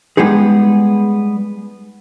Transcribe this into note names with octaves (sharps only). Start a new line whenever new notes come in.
G3 G#3 B3 D#4 G#4